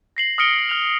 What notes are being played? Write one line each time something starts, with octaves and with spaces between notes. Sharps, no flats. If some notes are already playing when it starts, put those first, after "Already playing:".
A#6 C7 F#7
D#6 F6 A#6 C#7 D7 G7
F6 F7